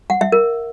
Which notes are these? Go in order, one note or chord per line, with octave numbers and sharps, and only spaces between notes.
F#5
E5
A#4